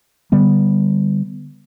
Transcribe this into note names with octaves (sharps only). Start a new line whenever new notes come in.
D3 G3 B3